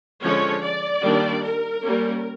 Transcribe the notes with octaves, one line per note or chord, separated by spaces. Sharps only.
D3 F3 G#3 C#4 C#5
D5
D#3 G3 A#3 D4
A#4
G3 A#3 C#4